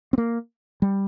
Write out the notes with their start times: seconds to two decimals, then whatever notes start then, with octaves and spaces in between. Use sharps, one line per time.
0.13 C4
0.18 A#3
0.82 G3